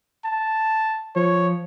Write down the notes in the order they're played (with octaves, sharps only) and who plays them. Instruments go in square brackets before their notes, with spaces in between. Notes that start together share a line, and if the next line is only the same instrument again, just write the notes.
[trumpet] A5
[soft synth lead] F3 [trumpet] C#5